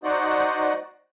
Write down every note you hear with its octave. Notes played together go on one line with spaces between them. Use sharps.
D#4 F#4 C5 D5 D#5 F#5